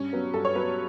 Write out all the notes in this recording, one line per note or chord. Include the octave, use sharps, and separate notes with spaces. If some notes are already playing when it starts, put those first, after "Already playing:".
Already playing: G2 C#4
F#3 B3
G2 A4
C#5
F#3 B3 B4